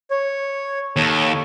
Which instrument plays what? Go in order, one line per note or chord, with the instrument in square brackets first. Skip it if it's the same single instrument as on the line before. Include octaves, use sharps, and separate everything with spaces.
[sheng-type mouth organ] C#5
[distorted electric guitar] D#2 [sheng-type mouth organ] A4 C#5